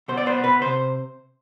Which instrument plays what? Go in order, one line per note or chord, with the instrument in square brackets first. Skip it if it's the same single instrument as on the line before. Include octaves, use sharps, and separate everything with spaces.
[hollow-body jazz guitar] B2 C5
D5
B3 C5
B2 B4
C3 C5